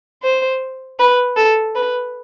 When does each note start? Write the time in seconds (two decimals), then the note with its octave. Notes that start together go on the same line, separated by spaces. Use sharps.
0.23 C5
1.00 B4
1.37 A4
1.75 B4